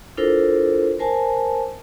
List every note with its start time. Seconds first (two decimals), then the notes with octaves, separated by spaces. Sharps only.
0.17 D4 E4 F4 A4 A#4 C5
0.99 A#4 C5 G#5 A5